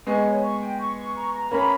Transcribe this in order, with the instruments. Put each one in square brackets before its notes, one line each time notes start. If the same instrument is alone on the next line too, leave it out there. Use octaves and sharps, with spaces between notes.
[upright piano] G#3 B3 [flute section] C#6
[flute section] C#5
C#6
G5
C#6
C#6
A#5
A#5
[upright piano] A#3 C#4 [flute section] B5